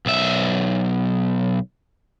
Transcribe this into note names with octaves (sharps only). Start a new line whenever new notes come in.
B1 E5